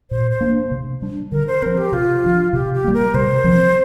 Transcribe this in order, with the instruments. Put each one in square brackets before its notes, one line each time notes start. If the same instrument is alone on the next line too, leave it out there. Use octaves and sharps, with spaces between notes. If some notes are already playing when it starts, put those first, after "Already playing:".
[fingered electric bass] A#2 [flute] C5
[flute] C5
[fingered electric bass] A#3 D4
C3
G3 D4
[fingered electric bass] D3 [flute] A#4
[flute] C5
[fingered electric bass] F3 C4 [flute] A#4
[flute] G4
[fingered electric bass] C3 [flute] F4
[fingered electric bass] F3 D4
[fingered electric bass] C3 [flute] G4
[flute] G4
[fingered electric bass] G3 A#3
[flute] A#4
[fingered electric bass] C3 [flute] C5
[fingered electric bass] F3 C4